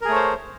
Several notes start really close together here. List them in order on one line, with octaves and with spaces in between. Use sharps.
A#4 G#4 A3 C#5 C5